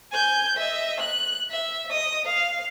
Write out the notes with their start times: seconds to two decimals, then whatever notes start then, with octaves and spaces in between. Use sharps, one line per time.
0.11 G#5 G6
0.56 D#5 E5
1.00 F#6
1.51 E5
1.91 D#5 D#6
2.25 F5